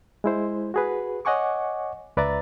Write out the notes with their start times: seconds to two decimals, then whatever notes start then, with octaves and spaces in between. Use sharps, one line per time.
0.24 G#3 E4 C5
0.74 F#4 G#4 B4
1.25 C#5 D#5 F#5 G#5 C#6 D6
2.17 C#2 B4 D5 E5 A#5 A6